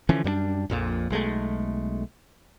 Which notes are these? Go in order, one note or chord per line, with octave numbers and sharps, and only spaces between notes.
D3 E3 F3 C#4
F#2 G3 A#3 D4
A#1 F2 A#2
B1 G#3 A3